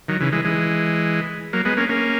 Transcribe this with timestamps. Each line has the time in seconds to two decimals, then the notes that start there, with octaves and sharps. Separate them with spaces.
0.08 D#3 F#3
0.20 C#3 E3
0.32 E3 G#3
0.45 E3 G#3
1.53 F#3 A#3
1.65 G#3 B3
1.77 A#3 C#4
1.89 A#3 C#4